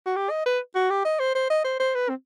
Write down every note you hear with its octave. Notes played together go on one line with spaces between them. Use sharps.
F#4
G4
D#5
B4
F#4
G4
D#5
C5
C5
D#5
C5
C5
B4
C4